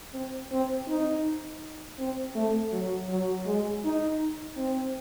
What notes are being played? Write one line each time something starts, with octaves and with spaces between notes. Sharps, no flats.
C4
C4
D#4
C4
A3
F#3
F#3
G#3
D#4
C4